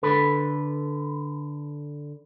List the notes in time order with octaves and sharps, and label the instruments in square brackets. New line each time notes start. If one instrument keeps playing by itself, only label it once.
[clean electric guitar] D3 A4 B4